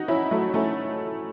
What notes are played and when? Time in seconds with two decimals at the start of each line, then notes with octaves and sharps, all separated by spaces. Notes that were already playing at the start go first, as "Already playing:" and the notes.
Already playing: D#4 F#4
0.08 C#4 E4
0.31 F#3 A3
0.54 A3 C#4